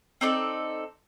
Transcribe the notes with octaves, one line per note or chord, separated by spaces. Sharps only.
C4 D#4 A4 D5